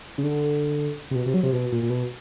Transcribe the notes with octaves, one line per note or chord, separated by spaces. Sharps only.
C#3
D3
C3
B2
C3
F#3
C3
B2
A#2
A#2
B2